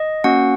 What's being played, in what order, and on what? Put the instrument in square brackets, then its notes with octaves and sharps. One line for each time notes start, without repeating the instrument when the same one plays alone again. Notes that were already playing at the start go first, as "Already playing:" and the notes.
Already playing: [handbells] D#5
A#3 C#4 F#4 F#5